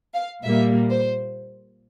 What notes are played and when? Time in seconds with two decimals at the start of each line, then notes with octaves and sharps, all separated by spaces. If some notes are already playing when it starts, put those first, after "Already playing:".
0.14 F5
0.43 A#2 G3 A#3 E5
0.90 C5